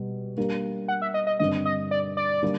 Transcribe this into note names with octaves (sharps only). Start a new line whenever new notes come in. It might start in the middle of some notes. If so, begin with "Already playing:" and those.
Already playing: B2 G3
G3 A#3 D4 G4 A#4
F#5
E5
D#5
D#5
G2 D3 G3 C4 D#5
D#5
D5
D5
D3 G3 A#3 D4